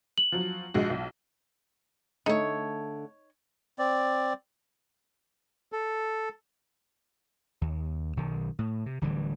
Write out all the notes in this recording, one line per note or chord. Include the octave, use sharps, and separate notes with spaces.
F#7
F3 F#3
A#1 G#3 F#4
B1
D3 A3 D#4 A4 C#5
C4 D5
A4
D#2
B1 D#3
A2
C3
D1 D3 E3 G3